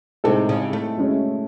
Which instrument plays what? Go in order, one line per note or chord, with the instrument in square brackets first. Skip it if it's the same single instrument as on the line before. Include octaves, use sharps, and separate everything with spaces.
[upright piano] A2 G#3 C4 D#4 A4 [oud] C3
[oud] C#3
A3
[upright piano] F#2 C#3 G#3 C#4 E4